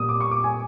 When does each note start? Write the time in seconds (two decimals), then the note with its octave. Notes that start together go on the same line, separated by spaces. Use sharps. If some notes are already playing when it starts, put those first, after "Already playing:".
Already playing: A#2 G3 B3 D#6
0.09 D6
0.21 C#6
0.31 D6
0.44 G#5